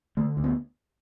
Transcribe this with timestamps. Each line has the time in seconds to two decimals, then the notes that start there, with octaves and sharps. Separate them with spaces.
0.17 D3 A3
0.37 D2
0.44 B3